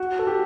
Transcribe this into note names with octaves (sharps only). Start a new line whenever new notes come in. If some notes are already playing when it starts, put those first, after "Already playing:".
Already playing: F#4
A4
G4